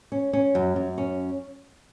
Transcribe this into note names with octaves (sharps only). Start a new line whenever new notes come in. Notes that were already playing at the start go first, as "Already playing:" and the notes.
C#4
C#4
F#2
F#2
C#4